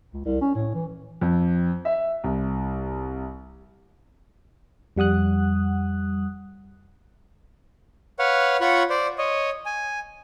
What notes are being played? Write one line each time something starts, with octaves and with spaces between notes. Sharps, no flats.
C#2
C2
C#4
A2
E3
F2
E5
C2
F2 G3 F#5 D#6 F#6
B4 C#5 F5 F#5
F4 C#5 F#5 B5 C#6
C5 D5
C#5 D#5
G#5